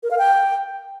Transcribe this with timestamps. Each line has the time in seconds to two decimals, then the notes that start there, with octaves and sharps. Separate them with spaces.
0.03 A#4
0.11 F5
0.18 G5